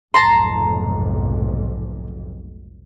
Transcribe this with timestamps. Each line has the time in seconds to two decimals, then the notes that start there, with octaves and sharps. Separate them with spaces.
0.14 F1 B1 G#2 A5 A#5 C6